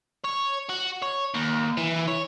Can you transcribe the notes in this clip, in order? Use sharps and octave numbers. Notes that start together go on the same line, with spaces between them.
C#5
F#4
C#5
D#2
E3
C#5